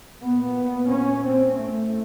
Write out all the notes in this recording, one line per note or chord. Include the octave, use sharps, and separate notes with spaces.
A#2 B3
C#4
C4
A2 A3